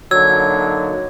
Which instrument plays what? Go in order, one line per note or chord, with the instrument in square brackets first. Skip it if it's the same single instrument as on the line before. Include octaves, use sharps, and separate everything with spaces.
[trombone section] D3 A#3 D#4 [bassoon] F#3 [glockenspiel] E6 [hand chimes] G#6